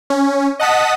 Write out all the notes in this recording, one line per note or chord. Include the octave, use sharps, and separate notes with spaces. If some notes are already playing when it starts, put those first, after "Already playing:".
C#4
D#5 F#5 A5 D#6 B6